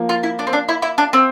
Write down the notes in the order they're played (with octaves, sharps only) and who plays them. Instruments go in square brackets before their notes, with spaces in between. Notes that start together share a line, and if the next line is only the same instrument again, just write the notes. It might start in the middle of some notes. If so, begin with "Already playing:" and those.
Already playing: [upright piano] F3 A#3
[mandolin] F4
E4
D4
C4
D4
E4
E4
D4
C4